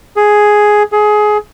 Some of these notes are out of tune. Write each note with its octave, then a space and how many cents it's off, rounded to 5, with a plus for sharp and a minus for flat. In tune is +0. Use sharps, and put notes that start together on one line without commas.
G#4 +5
G#4 +20